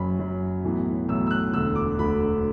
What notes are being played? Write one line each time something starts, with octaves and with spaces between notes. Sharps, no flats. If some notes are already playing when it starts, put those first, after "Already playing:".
Already playing: F#1 F#2 F#3 B5
F#1 F#2 F#3
B1 A2 E3 B3
B1 A2 E3 B3 E6
E6
F#6
E1 D2 D3 E6
D6
E1 D2 D3 B5